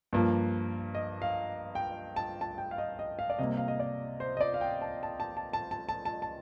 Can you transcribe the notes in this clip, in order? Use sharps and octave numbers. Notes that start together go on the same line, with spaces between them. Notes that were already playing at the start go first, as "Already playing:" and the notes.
G2 F3 A#3
D#5
F5
G5
A5
A5
G5
F5
D#5
D#5
F5
D5
C3 G3 A#3 D#5
F5
D#5
D5
C5
D#5
D5
F5
G5
A5
A5
A5
A5
A5
A5
A5
A5
A5